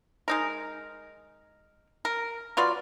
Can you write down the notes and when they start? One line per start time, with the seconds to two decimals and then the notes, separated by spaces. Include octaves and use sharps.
0.28 G#3 D#4 A#4
2.05 A#4
2.57 F#3 F4 B4 D5